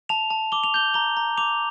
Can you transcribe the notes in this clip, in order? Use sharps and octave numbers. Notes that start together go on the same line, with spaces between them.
A5 F7
A5
D6 G7
F7
G6 G7
A#5 G7
A#5
D6 F7